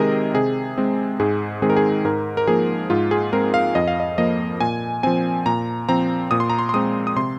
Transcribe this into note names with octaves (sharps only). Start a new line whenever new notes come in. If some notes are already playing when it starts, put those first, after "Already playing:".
Already playing: C3 D#3 G#3 C4 G#4 A#4 D#5
C3 G#4
G#3 C4
G#2 G#4
D#3 G#3 C4 G#4
A#4
G#4
G#2 A#4
A#4
F3 A#3 G#4
G#2 F4
G#4
G#3 C4 A#4
F5
F2 D#5
F5
D#5
F3 A#3 D#5
A#2 G#5
F3 C4 G#5
A#2 A#5
F3 C4 A#5
A#2 D#6
C6
A#5
C6
C6
G#3 C4 D#6
D#6
C3 C6